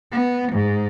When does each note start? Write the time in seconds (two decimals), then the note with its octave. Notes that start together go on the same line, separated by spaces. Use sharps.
0.12 B3
0.52 G#2